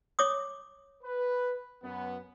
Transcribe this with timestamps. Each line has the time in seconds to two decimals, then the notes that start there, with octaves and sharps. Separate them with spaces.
0.19 C#5 D6 D#6
1.03 B4
1.83 F#2 B3